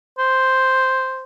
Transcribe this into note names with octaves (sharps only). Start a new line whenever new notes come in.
C5